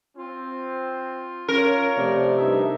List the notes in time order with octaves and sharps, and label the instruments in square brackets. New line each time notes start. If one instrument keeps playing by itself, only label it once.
[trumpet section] C4 [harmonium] F4
[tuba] C#4 [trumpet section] F4 C#5 A#5 [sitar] A#4
[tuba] C3 [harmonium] F3 A3 D5
[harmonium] G2 E5 [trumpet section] D#4 A4 D#5